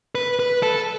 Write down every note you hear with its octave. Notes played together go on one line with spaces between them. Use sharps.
B4
B4
A4